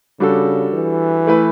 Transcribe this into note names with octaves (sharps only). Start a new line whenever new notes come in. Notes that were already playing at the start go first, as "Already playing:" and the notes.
C#3 G3 D4 F#4 A4
E3
A3 E4 B4